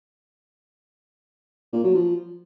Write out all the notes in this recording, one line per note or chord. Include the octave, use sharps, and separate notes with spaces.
A#2
F#3
F3